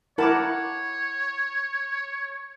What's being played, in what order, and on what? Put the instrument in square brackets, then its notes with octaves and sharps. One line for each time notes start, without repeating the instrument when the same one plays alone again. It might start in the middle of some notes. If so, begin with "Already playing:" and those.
[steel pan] E4 A#4 A5 [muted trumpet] C#5 [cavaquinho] F#5 B5 D6